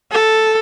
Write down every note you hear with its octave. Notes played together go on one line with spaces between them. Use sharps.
A4